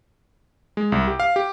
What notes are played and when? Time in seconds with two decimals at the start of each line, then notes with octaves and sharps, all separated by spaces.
0.77 G#3
0.92 C2
1.08 G4
1.20 F5
1.36 G4